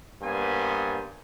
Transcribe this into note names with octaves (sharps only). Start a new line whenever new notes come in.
G2 A#3 B3 C5 G#5